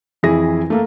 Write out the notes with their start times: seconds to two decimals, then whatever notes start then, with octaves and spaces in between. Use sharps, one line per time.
0.23 F2 E3 E4 G#4 A#6
0.70 A3 A#3 A4